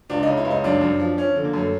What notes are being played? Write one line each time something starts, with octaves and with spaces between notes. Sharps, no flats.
C#2 D4
C#3 D#4
E4
C#2
D#4
F#2 D4
F#2
F3
F3 C#4
D3
A#3
F#2 A3